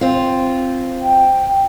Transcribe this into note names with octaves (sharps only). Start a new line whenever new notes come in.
C4 F4
G5